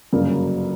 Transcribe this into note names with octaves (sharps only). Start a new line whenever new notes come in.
G1 F#2 C#3 F#3 A#3